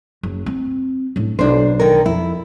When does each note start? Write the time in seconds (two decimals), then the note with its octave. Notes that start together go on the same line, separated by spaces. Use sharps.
0.23 F#1
0.46 C4
1.16 A2 D4
1.39 B1 D4 C5
1.79 D3 D#3 A#4
2.06 F2 E4